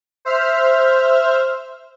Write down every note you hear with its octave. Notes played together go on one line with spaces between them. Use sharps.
C5 E5 F6